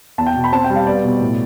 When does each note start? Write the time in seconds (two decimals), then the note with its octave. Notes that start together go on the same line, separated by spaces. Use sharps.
0.18 E2 A5
0.27 G5
0.36 B2
0.44 B5
0.52 C4 A5
0.64 G5
0.70 G3
0.76 F5
0.86 B3 D5
1.04 B2
1.21 A2